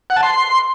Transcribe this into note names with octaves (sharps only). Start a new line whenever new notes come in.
F#5
A5
C6